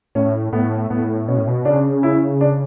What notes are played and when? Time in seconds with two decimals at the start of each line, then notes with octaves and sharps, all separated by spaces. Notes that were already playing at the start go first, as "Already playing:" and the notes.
0.15 A2 C#4
0.53 A2 B3
0.90 A2 B3
1.28 B2 C#4
1.37 A2
1.47 B2
1.65 C#3 D4
2.03 E4
2.41 D4